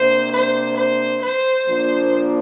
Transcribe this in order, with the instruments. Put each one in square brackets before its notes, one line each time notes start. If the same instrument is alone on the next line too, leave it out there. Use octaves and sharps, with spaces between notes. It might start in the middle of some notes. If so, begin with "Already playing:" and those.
Already playing: [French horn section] C3 A#3 D4 [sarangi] C5
[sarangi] C5
C5
C5
[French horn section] A#2 F3 A#3 D4